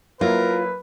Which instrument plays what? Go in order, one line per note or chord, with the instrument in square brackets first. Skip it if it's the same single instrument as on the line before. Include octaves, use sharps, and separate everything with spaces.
[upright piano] F#3 A#3 E4 [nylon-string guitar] F4 [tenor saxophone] A#4 [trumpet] B4